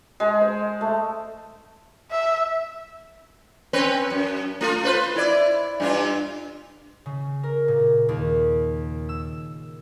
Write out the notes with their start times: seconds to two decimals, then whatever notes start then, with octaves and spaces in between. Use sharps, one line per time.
0.20 G#3
0.41 C5
0.81 A3
2.11 E5
3.73 C4 C#4 B4
4.10 F#2
4.61 A3 F4
4.83 F4 B4 C5
5.16 E4 D5
5.80 G2 D4 F4
7.06 C#3
7.43 A#4
7.68 A#2
8.09 D#2
9.09 E6